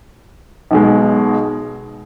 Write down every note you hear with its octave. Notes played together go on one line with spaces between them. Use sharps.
B1 B2 G#3